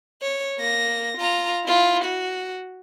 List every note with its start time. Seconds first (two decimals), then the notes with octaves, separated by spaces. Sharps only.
0.22 C#5
0.59 A#3 A#6
1.18 F4 A#5
1.64 E4 F4
2.04 F#4